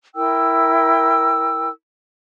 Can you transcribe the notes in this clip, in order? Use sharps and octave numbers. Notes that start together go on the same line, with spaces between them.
E4 A#4 G5 E6